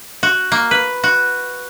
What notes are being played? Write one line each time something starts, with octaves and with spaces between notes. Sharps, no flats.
F#4
A#3
B4
F#4